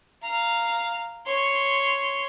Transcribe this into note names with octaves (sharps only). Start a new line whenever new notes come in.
F5 A#5
C#5 C6